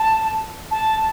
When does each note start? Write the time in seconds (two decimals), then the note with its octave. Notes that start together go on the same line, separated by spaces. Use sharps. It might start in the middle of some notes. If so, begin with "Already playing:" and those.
Already playing: A5
0.71 A5